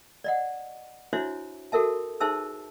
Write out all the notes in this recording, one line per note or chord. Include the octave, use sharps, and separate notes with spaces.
D5 D#5 F#5
D4 E4 F#4 C5 C#5 E5
F#4 A4 A#4 E5 A5
D#4 G#4 C5 E5 A5 E6